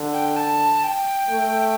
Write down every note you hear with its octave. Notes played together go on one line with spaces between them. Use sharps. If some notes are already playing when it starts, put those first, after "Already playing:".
Already playing: D3
G5
A5
G5
A3